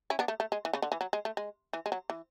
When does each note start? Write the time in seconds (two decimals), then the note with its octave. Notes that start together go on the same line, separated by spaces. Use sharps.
0.10 C#4 E4
0.19 B3 D4
0.28 A3
0.40 A3
0.52 G#3
0.65 E3
0.73 C#3
0.82 D3
0.92 E3
1.01 F#3
1.13 G#3
1.25 A3
1.37 G#3
1.73 E3
1.86 G#3
1.92 F#3
2.10 E3